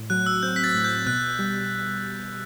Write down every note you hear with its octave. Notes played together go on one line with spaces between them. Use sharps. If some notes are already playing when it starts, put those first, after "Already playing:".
Already playing: A2
F#3 F#6
E6
C4 G6
B6
A6
A2
G6
B2 F#6
G3